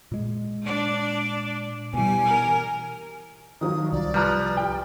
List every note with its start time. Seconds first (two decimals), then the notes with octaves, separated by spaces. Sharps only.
0.12 A#2 G#3
0.65 D4 D5
1.94 B2 E3 G3 G#5
2.27 A#4
3.61 D#3 F3 F#3 D#6
3.92 C2 D5
4.14 F3 G3 B4 A#5 F#6
4.57 G4 G5